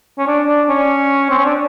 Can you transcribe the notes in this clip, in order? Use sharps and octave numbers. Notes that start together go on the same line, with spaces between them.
C#4
D4
D4
C#4
C4
C#4
D4